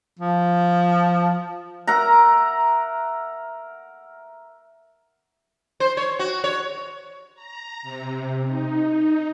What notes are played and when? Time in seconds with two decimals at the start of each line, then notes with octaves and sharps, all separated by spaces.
0.20 F3
1.87 A#4 E5 F#5 A#5
5.80 C5
5.97 C#5
6.19 F#4
6.44 C#5
7.35 A#5
7.83 C3
8.45 D#4